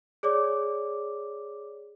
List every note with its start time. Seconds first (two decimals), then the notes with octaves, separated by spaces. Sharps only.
0.23 G#4 C#5 D5 D6